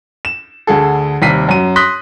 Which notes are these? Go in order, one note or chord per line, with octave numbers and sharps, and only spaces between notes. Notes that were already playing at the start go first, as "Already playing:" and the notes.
E7
D2 D3 G#4 A4
D#2 C3 G3 B6 C7 D#7
F#2 D#7
C6 D#6 F#6 A#6 B6 G7